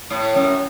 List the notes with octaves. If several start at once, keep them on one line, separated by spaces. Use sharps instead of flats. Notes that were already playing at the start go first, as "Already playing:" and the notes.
A2
F#2